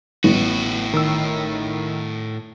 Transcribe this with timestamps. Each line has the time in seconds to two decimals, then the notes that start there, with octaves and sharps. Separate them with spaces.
0.24 A1 A2 B3 F#4
0.93 D#3 E6